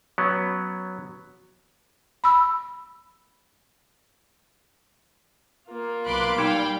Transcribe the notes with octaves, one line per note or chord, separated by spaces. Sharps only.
F#3 B3 C#4
B5 E6
A#3 F4
B1 B5 C6 D6 F#6 D7
G3 D#4 F5 G5 B5